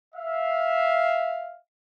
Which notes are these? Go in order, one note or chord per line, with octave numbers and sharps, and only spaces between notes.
E5 F5